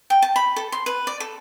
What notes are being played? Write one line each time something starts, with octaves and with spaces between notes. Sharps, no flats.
G5
A5
B5
A4
C6
B4
D5
A4